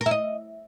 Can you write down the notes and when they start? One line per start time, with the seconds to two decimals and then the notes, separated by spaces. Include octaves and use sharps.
0.01 A#4
0.06 E4
0.11 D#5